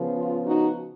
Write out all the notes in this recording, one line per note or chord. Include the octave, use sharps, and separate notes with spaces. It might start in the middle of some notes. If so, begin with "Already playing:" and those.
Already playing: C#3 F3 B3
F4
D#4 F#4